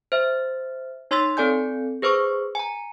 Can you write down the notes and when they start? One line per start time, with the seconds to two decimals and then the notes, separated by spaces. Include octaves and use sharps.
0.12 C5 E5
1.11 D#4 C#5 C6 E6 A6 B6
1.37 C4 A4 D5 G#5 G6
2.02 G#4 B4 C5 C#6 D6
2.55 G#5 A#5